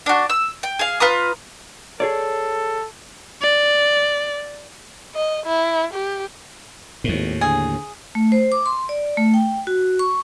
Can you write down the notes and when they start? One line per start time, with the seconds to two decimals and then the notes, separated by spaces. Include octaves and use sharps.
0.06 D4 F#4
0.30 E6
0.63 G5
0.79 G#4 F5
1.00 F4 B4 A#5 D#6
2.00 G#4 A4 C#5 D5
3.42 D5
5.15 D#5
5.46 E4
5.93 G4
7.04 G#1 D#2 A2
7.41 D3 G#4
8.15 A3
8.32 C5
8.52 D6
8.66 C6
8.89 D5
9.17 A3
9.34 G5
9.67 F#4
9.99 C#6